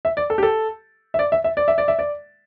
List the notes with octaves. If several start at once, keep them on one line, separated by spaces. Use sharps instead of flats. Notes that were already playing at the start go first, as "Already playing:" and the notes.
E5
D5
A4
G4
A4
E5
D5
E5
E5
D5
E5
D5
E5
D5